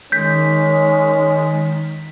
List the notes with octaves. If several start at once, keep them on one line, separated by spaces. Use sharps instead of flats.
D#3 G#3 C#4 G6 B6